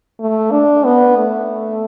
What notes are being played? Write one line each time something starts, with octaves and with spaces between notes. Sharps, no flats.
A3
D4
B3
A3